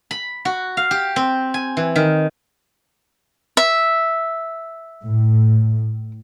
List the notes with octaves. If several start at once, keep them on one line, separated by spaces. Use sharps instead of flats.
B5
F#4
F5
G4
C4
G#5
E3
D#3
E5
A2